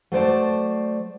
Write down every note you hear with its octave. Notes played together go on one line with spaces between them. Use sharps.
F#3 A3 C5 D5 A5